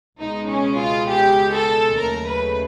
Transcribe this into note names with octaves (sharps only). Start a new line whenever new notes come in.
C#2 B2 G#3 D#4
C#4
F4
G4
A4
D#2 C#3 F#3 A3 A#4
B4